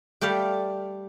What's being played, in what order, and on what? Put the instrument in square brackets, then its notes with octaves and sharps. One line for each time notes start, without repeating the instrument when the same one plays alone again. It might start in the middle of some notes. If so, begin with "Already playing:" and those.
[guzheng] G3 A3 G4 D5 F5